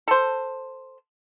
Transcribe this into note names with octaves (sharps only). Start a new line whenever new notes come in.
A4 C5